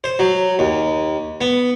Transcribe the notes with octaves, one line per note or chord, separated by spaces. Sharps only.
C5
F#3
D#2
B3